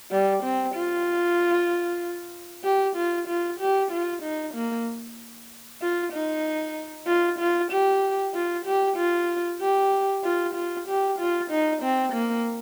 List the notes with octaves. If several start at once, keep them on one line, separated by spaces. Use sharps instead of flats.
G3
C4
F4
G4
F4
F4
G4
F4
D#4
A#3
F4
D#4
F4
F4
G4
F4
G4
F4
G4
F4
F4
G4
F4
D#4
C4
A#3